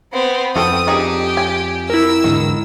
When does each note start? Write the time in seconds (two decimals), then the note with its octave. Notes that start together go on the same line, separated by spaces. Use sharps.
0.13 B3 C4
0.56 F2 F#4 A4 G5 D#6
0.87 D4 D#4 G4 G#4
1.37 G#5
1.90 E4 A#4 E6
2.24 E2 G#2 D3 D#3